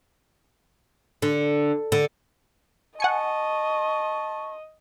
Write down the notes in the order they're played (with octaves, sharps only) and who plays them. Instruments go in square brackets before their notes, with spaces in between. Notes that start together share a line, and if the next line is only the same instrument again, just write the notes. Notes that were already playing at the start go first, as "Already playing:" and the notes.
[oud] D3
D3
[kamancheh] D#5 [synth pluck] F#5 G#5 C#7 [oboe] A5 [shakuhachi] C#6